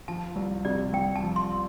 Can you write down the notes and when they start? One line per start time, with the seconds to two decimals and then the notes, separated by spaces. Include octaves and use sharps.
0.08 F3 A5
0.36 C2
0.65 C3 D5
0.93 C2 G5
1.16 A5
1.23 F3
1.36 C6